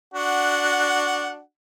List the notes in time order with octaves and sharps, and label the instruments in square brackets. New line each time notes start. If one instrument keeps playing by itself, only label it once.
[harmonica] D4 F#4 F#5